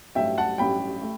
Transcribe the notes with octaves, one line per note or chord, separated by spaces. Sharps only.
A1 G2 F#3 A3 E5 G5
F#5 A5
A1 G2 F#3 A3 G5 B5
A3